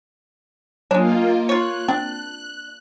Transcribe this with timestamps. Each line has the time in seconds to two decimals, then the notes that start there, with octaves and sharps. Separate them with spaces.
0.91 F#3 G#3 A#3 D4 F4
1.49 F4 C#5 F#6
1.88 C4 D4